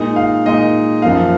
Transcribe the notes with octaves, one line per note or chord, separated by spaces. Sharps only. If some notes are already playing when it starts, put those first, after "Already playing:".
Already playing: A#2 G#3 D#4
F5
A#2 G#3 D#4 D#5
F#2 F3 A#3 F5